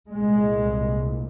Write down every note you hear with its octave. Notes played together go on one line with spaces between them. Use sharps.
C2 A#2 G#3